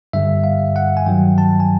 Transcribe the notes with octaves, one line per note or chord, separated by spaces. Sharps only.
G2 D3 G3 E5
F5
F#5
G#5
G2 D#3 F#3 G5
A5
G#5